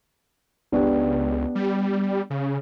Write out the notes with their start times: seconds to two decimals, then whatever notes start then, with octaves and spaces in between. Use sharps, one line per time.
0.72 C#2 B3 D4 G4
1.55 G3
2.30 C#3